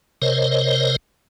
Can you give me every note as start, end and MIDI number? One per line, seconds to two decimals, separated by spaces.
0.22 0.96 48
0.22 0.96 70
0.22 0.96 72
0.22 0.96 73
0.22 0.96 75